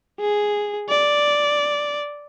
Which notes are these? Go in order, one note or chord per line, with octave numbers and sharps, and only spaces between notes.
G#4
D5